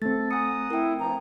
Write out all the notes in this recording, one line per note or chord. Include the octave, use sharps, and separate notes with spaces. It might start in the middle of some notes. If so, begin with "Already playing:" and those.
A3 C4 A4 A6
F#5 G#5 A#5 D#6 C#7
E4 A#4 G5
G2 F3 A#5